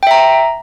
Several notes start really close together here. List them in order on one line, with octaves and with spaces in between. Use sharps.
G5 E5 A#5